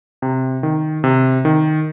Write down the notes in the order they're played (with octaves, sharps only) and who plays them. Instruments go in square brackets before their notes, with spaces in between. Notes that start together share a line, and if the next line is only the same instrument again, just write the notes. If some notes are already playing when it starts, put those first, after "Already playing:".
[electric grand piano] C3
D#3
C3
D#3